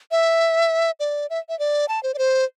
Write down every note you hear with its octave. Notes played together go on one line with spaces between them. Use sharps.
E5
D5
E5
E5
D5
A5
C5
D5
C5